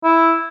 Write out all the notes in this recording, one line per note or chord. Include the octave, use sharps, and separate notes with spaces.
E4